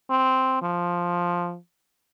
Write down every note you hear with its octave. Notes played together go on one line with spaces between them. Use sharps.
C4
F3